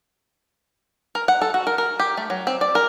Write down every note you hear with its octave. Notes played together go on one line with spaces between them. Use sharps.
A#4
F#5
A4
F#4
A#4
A#4
G4
A3
F#3
C4
D5
A#4